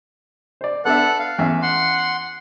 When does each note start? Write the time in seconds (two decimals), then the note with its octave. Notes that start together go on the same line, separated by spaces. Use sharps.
0.61 C5 D5
0.85 B3 D4 A4 E5 F#5 F#6
1.19 F5
1.39 E2 C#4 E5
1.62 F#5 C6